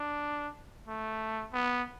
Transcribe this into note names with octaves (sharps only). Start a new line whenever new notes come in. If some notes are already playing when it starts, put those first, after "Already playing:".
Already playing: D4
A3
B3